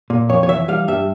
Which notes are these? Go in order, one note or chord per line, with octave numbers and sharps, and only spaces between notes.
A#2
F2 C#5
C#5
E3 E5
G3 F5
G2 E5